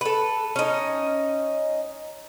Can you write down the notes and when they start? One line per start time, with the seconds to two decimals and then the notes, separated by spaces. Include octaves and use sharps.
0.01 A4 B4
0.56 C#4 D#4